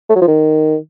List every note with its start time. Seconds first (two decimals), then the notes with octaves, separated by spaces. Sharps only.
0.10 A3
0.16 F#3
0.22 F3
0.28 D#3